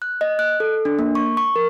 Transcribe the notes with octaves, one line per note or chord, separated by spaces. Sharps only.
F#6
D#5
F#6
A4
D4
A#3
C#6
C#6
A#4